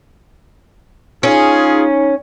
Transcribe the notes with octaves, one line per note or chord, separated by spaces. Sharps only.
C#4 D#4 F4 G#4